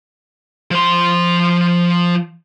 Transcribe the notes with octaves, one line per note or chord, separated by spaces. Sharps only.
F3 C6